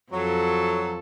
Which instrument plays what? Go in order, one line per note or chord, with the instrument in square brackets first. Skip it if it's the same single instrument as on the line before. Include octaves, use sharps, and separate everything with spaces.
[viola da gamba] F2 A4 [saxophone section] F#3